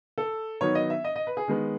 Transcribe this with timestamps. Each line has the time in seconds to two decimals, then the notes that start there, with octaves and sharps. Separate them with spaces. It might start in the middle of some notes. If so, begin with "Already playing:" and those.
0.18 A4
0.61 D#3 F#3 B3 D#4 C#5
0.75 D#5
0.90 E5
1.04 D#5
1.16 D#5
1.27 B4
1.37 G#4
1.48 D#3 G#3 B3